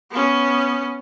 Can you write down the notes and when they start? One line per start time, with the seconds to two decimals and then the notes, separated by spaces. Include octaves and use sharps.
0.11 B3 C#4